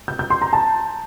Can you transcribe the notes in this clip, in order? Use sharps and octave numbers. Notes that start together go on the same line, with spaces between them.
G6
G6
C6
A#5
A5